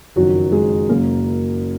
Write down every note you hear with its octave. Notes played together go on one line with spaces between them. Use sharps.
F#1 F2 D#3 F#3 F#4
G#3 G#4
F#1 F#2 C#3 F#3 A#3 A#4